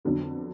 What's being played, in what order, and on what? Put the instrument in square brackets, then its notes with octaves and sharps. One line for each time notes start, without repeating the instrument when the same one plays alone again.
[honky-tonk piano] F2 D3 F#3 B3